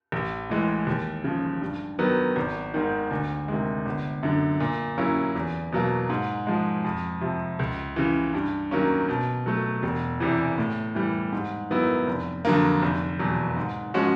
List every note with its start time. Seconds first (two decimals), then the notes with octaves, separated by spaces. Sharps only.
0.12 A1
0.50 A2 E3 G#3
0.87 D#2
1.24 C#3 F3
1.62 G2
1.99 D#3 F#3 B3
2.36 G#1
2.74 G#2 D#3
3.11 D2
3.48 C3 D#3 G#3
3.86 G1
4.23 F#2 D3
4.60 A#2
4.98 F#3 A#3 C#4 E4
5.35 E2
5.72 B2 F#3 A#3
6.10 G#2
6.47 F3 G#3
6.84 F2
7.21 C3 F3
7.59 C#2
7.96 C#3 E3
8.34 G2
8.71 D#3 F#3 A#3 C#4
9.09 B2
9.46 F#3 A3
9.83 E1
10.20 E2 C3 E3
10.58 A2
10.95 E3 G3
11.33 G#2
11.70 D#3 F#3 B3 E4
12.07 F1
12.45 F2 D3 F#3 A#3
12.82 F1
13.19 E2 B2 F#3
13.57 G#2
13.94 F3 G#3 C#4 F#4